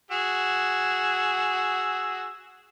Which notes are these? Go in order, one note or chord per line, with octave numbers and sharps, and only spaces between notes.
F#4 G#4 E6